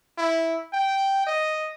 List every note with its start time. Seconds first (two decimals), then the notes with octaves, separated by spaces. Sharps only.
0.18 E4
0.73 G5
1.27 D#5